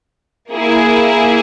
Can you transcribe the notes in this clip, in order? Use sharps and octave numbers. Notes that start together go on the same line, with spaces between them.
A#3 E4 G#4